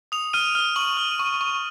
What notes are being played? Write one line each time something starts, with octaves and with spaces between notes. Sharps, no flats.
D#6 F7
F6 D#7
F6
C#6 F#7
F6
C#6
C#6